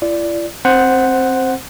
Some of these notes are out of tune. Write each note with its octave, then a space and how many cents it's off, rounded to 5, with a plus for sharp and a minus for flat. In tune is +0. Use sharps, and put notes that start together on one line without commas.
E4 +45 D5 -5
C4 +15 C5 +0 F#5 +0